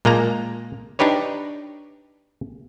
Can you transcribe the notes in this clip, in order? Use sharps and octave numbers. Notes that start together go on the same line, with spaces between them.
A#2 G#3 A#3 A5 A#5
D4 D#4 G4 B4 C#5